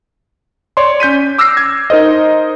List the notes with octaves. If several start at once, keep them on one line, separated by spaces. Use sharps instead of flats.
C#5 D5 C6
C#4 G6 B6 D#7
D6 E6 F6 A#6 C7
G#6
D#4 A#4 C5 D#5